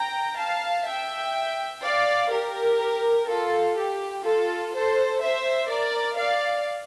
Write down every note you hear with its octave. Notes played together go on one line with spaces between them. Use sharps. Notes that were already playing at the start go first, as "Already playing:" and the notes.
Already playing: G5 A#5
F5 A5
E5 G5
D5 F5
G4 A#4
F4 A4
G4
F4 A4
A4 C5
C5 E5
A#4 D5
D5 F5